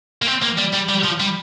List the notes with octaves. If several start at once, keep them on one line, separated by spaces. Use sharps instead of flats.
A#3
C4
A#3
G3
G3
G3
F3
G3